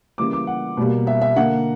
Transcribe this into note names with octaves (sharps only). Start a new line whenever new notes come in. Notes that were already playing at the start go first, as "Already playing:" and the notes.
C#3 E3 G3 A#3 D6
D6
F#5
B2 G3 A#3
E5
E5
D3 A#3 F#5